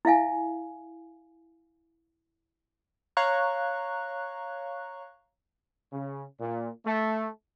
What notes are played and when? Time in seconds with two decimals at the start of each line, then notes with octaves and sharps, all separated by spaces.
0.05 E4 E5 F5 G#5
3.17 C#5 F5 A#5 C#6 F#6
5.92 C#3
6.40 A#2
6.86 A3